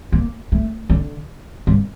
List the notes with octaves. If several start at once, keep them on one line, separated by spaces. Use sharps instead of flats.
A#3
A3
D3
G2